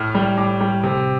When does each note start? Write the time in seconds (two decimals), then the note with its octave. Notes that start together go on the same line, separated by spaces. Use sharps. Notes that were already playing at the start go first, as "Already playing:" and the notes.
Already playing: A2 F6
0.15 G3
0.38 A2 D6
0.61 G3
0.83 C3